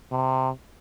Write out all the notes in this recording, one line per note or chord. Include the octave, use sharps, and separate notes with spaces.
C3